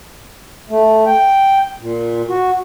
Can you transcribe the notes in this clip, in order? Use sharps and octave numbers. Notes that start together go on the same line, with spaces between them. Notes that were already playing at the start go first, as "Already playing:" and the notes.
A3
G5
A#2
F#4